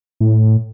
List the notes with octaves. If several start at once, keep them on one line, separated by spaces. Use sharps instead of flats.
A2